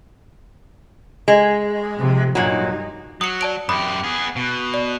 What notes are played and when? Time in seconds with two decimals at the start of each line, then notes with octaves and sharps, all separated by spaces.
1.28 G#3
1.99 C3 F3
2.35 G2 A#2 F#3 D#4
3.21 F#3 D#6 C#7
3.41 D5 A5 D7
3.69 F#2 G4 B5 D6 D#6
4.03 B3 G#4
4.36 B2
4.74 D5